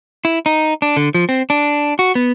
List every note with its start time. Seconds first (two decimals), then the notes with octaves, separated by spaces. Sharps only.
0.25 E4
0.46 D#4
0.82 D4
0.97 D3
1.15 F3
1.29 C4
1.50 D4
1.99 F#4
2.15 B3